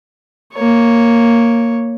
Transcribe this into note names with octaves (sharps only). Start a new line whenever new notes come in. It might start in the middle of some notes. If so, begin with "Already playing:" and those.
A#3 C#5